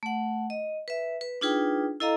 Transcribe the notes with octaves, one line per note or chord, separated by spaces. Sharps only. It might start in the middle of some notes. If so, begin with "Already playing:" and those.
A3 F#5
D#5
B4 E5
B4
D4 D#4 F4 G#4 B4 G5
E4 A4 D#5 F5 A#5